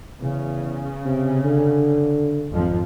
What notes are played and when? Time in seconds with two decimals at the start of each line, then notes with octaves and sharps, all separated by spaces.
0.21 E2 C#3
1.05 C3
1.44 D3
2.51 G#1 F2 F3